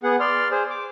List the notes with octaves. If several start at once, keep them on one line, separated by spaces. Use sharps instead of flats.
B3 G#4 F#5
D5 C6 F6
G#4 C5
D6